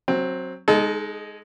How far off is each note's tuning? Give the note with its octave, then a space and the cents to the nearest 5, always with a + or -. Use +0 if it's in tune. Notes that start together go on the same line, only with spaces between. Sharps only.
F#3 +0 C4 +15
G#3 +0 D#4 +0 A4 -35